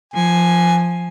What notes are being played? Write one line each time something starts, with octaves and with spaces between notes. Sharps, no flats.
F3 G#5